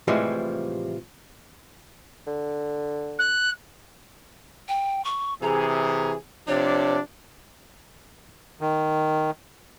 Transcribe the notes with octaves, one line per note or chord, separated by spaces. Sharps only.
A2 C3 E3 F3 G3 G#3
D3
F#6
G5
C#6
C3 E3 G#4 A#5
C3 F3 D4 C#5
D#3